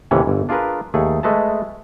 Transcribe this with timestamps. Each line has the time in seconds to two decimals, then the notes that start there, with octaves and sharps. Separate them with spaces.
0.11 D#2 A2 C3 E3 C#4
0.27 G1
0.49 D4 F4 G#4 A#4 B4
0.94 D#2 A3 G#4
1.23 G#3 A3 B4 D#5 A5